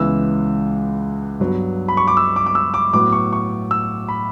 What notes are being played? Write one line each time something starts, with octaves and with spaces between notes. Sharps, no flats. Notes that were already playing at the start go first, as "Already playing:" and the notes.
Already playing: C#2 C#3 E3 B3 E6
G2 F#3 B3
B5
C#6
D6
E6
D6
D6
E6
D6
A2 F#3 B3 D6
C#6
C#6
E6
B5